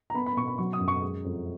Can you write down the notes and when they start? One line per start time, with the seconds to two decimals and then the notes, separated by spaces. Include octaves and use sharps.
0.10 A#5
0.14 B3 B5
0.26 B5
0.37 B2 C#6
0.48 B5
0.58 F#3 C#6
0.73 D#6
0.81 F#2
0.88 C#6
1.02 G#3
1.25 F2